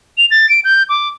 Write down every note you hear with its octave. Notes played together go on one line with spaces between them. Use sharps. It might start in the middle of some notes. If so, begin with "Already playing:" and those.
F7
A6
D7
G6
D6